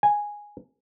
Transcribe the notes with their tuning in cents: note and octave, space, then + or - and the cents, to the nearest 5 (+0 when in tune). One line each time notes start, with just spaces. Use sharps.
G#5 -5